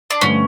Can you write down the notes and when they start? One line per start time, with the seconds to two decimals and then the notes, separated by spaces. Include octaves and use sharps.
0.10 D4
0.21 G2 D3 F3 A3 C#4